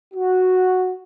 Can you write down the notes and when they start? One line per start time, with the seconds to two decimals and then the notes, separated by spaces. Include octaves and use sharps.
0.14 F#4